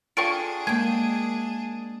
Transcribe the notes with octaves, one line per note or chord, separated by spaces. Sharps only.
D4 F4 G#4 A4 G5 C#6 D7
G#3 A#3 G5 G#5 G#6